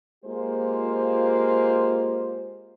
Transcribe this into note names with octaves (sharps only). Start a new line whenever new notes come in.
G#3 A#3 F4 G4 C5